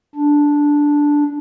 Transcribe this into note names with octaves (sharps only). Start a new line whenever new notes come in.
D4